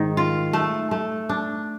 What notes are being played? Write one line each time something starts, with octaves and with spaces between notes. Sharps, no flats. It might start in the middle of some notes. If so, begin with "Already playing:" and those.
Already playing: G#2 D#3
F4
A3
A3
D4